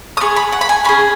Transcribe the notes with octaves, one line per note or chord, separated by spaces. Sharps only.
D#6
B3 G#4 C#6
B5
F#5
B5
G#5
C#4 G#4 B5